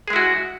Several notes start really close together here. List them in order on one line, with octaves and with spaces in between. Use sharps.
G#4 G#3 E4 F#4